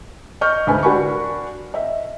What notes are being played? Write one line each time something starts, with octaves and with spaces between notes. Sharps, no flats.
D#5 C#6 F6 G6
D2 G#2 B4 G#5
D4 F#4 A#4 G#5 B5 C#6
D#5 E5